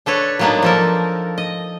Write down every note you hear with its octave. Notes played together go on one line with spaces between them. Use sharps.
D4 A4 B4 C#5
F#3 G3 A#3 B3 D4 D#4
F3 A4 A#4
D#5